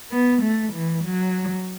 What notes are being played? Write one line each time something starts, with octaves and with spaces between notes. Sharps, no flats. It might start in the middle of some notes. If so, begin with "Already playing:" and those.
B3
A3
E3
F#3